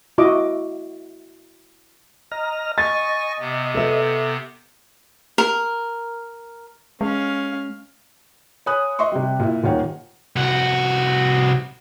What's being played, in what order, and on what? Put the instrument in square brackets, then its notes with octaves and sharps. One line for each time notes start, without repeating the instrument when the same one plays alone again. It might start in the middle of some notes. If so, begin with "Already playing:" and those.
[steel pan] E4 F#4 D#5 D6
[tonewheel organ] D#5 A#5 F6
[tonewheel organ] D#5 [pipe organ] G#5 C#6 A#6 [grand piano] A6
[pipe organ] C3 B3
[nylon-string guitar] A4 B4 E5
[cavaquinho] A#4
[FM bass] G#3 [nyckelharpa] C#4 F5
[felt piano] C#5 G#5 B5 D#6 F#6
D#5 E5 C6 C#6
C3 G3
A#2 E4
D#1 A#2 D#3 C#5 F#5
[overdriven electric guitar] C2 F#4